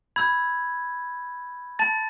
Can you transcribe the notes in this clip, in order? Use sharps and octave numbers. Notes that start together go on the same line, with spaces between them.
B5 E6 G6 G#6
A5 A6